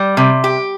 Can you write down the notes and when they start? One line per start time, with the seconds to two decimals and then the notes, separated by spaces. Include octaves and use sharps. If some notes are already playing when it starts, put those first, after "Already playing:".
Already playing: G3
0.17 C3
0.44 G4